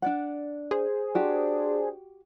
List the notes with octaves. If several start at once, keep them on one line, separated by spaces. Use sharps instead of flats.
D4 D5 F#5
G#4 C5
D4 F#4 G4